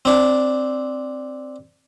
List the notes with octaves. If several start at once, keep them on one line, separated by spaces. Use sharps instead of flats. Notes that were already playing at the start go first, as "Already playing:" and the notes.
C4 D4